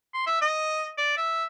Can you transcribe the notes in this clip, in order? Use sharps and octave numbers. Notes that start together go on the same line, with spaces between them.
C6
E5
D#5
D5
E5